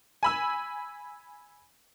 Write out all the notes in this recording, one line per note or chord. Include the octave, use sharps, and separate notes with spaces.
G#5 B5 E6